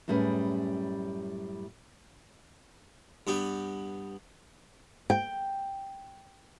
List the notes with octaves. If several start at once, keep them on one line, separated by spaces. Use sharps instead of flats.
F#2 A2 G3 C#4 G#4 B4
G2 B3 G4
G5